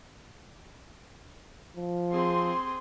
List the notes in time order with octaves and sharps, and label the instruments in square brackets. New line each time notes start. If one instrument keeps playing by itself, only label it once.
[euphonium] F3
[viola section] C4 G#4 C6